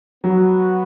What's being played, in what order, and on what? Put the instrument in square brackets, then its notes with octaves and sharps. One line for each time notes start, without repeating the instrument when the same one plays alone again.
[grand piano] F#3 [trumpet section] B3 F#4 B4